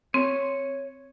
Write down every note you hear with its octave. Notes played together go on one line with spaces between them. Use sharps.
C4 C#5